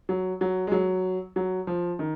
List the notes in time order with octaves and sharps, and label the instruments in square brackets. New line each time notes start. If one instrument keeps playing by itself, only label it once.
[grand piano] F#3
F#3
G#3
F#3
F#3
F3
D#3